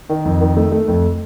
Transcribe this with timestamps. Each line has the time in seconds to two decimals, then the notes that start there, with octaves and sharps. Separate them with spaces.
0.09 D#3
0.25 F2
0.41 D#3
0.57 A3
0.72 A3
0.88 F2